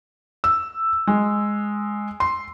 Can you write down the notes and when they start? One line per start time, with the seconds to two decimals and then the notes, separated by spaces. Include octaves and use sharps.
0.44 E6
1.07 G#3
2.20 C6